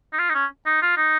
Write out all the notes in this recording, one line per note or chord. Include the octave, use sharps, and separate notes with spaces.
D#4
F4
D#4
C#4
D#4
F4
D#4